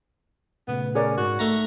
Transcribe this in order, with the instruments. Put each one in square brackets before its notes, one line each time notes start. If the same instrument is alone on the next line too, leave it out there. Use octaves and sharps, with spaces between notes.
[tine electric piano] A#2 C#3 A3 [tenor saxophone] B3
[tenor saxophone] C#4 [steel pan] G#4 A#4 D5
[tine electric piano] G#2 [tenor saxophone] F#4
[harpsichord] A3 A#5 [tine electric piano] D#4